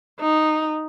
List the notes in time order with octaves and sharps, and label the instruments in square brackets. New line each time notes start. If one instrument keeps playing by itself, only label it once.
[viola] D#4